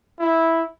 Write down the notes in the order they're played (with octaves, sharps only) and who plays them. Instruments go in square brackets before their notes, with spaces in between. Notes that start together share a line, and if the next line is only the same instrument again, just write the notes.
[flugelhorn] E4